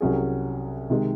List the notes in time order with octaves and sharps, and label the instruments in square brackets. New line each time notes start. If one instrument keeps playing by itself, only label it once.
[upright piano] C2 C3 F#3 C#4 G#4
C3 D#3 G#3